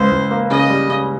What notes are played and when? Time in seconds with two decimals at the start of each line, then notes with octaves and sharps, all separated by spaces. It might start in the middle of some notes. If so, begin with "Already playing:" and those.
Already playing: C#2 C5
0.11 C#2
0.31 A#3
0.51 C#3 D#5
0.70 G3
0.89 C#3